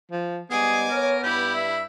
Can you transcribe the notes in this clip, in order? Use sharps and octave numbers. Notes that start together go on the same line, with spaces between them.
F3
G#2 G3 B3 G#4 D#5 G#5 D6
A#4 C#5
G2 E4 G4 B5
E5